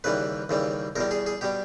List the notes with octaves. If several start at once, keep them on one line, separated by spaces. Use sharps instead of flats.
D#2 C#3 E3 G3 B4
D#2 C#3 E3 G3
E2 B2 G3 A#4
G#4
G#4
B2 G3 G4